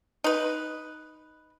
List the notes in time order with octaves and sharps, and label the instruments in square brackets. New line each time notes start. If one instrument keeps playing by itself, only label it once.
[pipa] D#4 B4